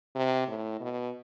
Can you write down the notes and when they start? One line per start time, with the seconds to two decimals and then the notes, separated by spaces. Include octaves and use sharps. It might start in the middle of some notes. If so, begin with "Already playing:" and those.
0.15 C3
0.48 A2
0.80 B2